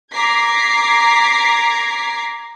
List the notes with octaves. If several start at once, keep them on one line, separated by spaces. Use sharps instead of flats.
A#5 D6 G#6 B6 C7